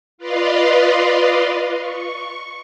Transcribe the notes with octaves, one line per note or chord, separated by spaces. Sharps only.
F4 B4 D5 D#5 F5 C6
C#6